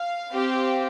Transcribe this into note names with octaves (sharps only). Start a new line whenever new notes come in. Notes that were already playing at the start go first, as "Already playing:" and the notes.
Already playing: F5
C4 G4